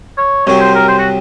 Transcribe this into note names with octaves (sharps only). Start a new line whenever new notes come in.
C#5
C2 C3 F#3 C4 C#5
C5
A#4
C5
F#4